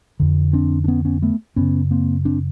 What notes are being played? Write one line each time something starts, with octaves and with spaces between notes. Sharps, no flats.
F2 D3
C4 D4
D4
B3 C#4
B3 C#4
A3 B3
F#2 C#3 B3 C#4
A#3 C4
C4 D4